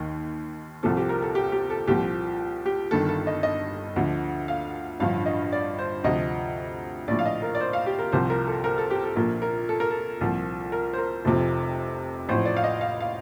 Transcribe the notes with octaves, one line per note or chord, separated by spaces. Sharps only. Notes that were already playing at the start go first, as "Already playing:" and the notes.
Already playing: D#2 D#3
C2 C3 F3 A4
G4
A#4
A4
G4
G4
A4
C2 A#2 F3 G4
G4
G1 G2 D#3 A4
A4
D#5
D#5
D2 D3 F3
F5
A1 G2 D3 F3 F5
D#5
D5
C5
D2 C3 F3 D#5
A#1 A2 F3 D5
F5
D#5
A#4
D5
C5
F5
G4
A#4
C2 C3 F3 C5
A#4
A4
A#4
A4
G4
A4
A#1 A#2 F3 A#4
A#4
A4
A#4
A4
C2 A#2 F3
A#4
C5
A#4
F1 F2 C3 F3
A1 A2 F3 C5
D5
F5
D#5
F5
F5